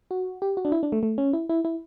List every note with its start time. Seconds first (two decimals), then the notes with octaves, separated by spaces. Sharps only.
0.11 F#4
0.42 G4
0.57 F#4
0.65 D4
0.72 E4
0.83 D4
0.92 A3
1.03 A3
1.18 C#4
1.33 E4
1.49 E4
1.65 E4